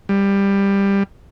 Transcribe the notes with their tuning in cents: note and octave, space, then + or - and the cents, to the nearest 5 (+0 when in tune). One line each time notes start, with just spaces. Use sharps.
G3 +15